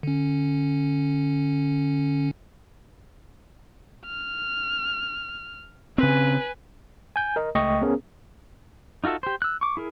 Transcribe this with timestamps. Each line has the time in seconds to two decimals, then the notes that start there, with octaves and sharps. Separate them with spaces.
0.03 D3 C#4
4.06 F6
5.98 C#3 C4 B4 G#5
7.16 G#5 G6
7.36 A#4 D#5
7.55 C#2 A3 D#5 G5 C#6
7.81 B3 C#4 G#4 A#4
9.04 D#4 F4 F#4 A4 E5
9.23 G4 C5
9.42 E6 F#6
9.61 C#6 D6
9.77 E4 G#4 A#4